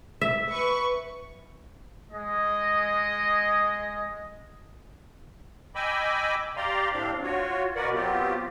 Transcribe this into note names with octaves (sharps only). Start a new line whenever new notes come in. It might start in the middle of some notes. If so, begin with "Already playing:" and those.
E5
B4 C#6
G#3 D#5
D#5 G5 G#5 B5 D6 E6
G4 D5 F5 A#5 C6
A2 C4 D4 F5
F4 F#4 C#5
B2 F#4 A#4 B4 D5 F#5
F#3 B3 C4 F4 G4